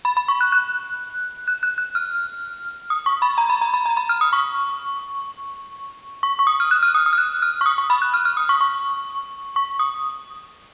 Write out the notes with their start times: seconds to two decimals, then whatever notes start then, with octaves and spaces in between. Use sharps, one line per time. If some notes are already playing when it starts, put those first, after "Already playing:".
0.05 B5
0.17 B5
0.28 C#6
0.41 F#6
0.52 F#6
1.48 F#6
1.63 F#6
1.78 F#6
1.95 F6
2.90 D#6
3.06 C#6
3.22 B5
3.38 A#5
3.50 B5
3.62 A#5
3.74 B5
3.86 A#5
3.97 B5
4.09 F6
4.21 D#6
4.33 C#6
6.23 C#6
6.39 C#6
6.47 D#6
6.60 F6
6.71 F#6
6.83 F6
6.95 D#6
7.06 D#6
7.13 F6
7.18 F#6
7.42 F6
7.61 C#6
7.66 D#6
7.78 C#6
7.90 B5
8.02 F#6
8.14 F6
8.25 F6
8.37 D#6
8.49 C#6
8.61 C#6
9.56 C#6
9.79 D#6